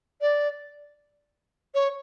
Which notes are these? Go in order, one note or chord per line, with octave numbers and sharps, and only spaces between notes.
D5
C#5